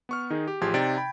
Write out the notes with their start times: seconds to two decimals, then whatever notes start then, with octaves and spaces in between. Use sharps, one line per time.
0.09 B3 C#6 F6
0.30 D#3 D#4 G#4
0.48 G4
0.61 A1 F3 G4 G#4 C6 G#6
0.74 C3 D#4 D5 G5 A6 D7
0.97 G5 B5